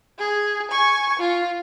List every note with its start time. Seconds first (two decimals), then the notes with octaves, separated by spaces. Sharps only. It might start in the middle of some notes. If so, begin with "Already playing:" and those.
0.19 G#4
0.71 G#5 C#6
1.19 F4